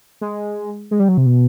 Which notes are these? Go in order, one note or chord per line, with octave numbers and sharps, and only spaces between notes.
G#3
G#3
G3
F#3
C3
B2